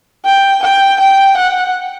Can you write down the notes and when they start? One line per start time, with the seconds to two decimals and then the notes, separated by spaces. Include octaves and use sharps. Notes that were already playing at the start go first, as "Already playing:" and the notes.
0.25 G5
0.63 G5
1.00 G5
1.37 F#5